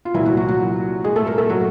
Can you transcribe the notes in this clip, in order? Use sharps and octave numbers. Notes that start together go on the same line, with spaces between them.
F4
C2 A#2 E3 F#3 E4
F#3 F#4
F#3 F#4
F#3 F#4
G#3 G#4
A3 A4
A#3 A#4
A3 A4
F#3 F#4